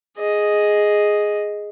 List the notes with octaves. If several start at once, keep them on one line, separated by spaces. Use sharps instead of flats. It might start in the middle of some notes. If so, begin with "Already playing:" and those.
G#4 D#5